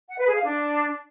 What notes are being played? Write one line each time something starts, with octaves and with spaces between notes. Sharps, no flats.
F#5
B4
G#4
F5
D4